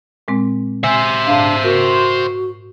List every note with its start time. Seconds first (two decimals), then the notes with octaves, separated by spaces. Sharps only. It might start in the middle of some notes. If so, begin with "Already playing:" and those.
0.28 A#2 G#3 C4
0.84 C5 E5 G#5
1.27 G#2 D4 F5
1.64 F#4 A#4